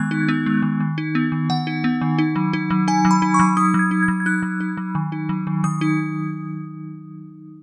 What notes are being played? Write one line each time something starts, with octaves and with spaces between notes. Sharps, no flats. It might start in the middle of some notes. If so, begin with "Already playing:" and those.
Already playing: D#3 G#3 B3 F#6 G#6
D#4
B3
G#3
D#3
D#3
D#4
B3
D#3
D#3 F#5
D#4
B3
D#3
D#4
F#3
D#4
F#3
D#4 G#5
F#3
B5
D#4
C#6
F#3
D#4 D#6
F#3
G#6
D#4
G#6
F#3
G#6
D#4 F#6
F#3
D#4
F#3
D#3
D#4
F#3
D#3
D#3 D#6
D#4